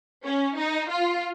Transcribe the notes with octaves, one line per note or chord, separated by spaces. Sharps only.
C#4
D#4
F4